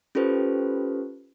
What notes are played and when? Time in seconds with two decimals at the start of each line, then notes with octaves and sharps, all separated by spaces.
0.15 C#4 F4 G4 A4 B4 C5